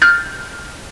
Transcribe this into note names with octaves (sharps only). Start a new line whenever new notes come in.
F6 G6 A6